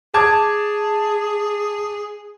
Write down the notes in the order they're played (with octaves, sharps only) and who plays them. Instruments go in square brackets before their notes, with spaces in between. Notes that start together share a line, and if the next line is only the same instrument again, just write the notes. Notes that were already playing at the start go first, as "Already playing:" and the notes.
[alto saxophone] G#4 [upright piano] A5 D6 G#6